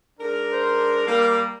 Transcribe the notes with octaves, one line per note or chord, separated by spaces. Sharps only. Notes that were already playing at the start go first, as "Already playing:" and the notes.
G#2 D4 A#4
C5
G3 A#3